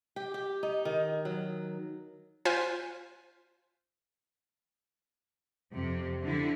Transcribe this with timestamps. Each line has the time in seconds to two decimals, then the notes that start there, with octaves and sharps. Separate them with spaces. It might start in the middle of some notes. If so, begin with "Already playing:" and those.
0.16 G4
0.34 G4
0.63 D#4
0.85 D#3
1.25 F#3
2.45 F4 C5 G#5 F#6 B6
5.73 F2 C3
6.22 D3 E4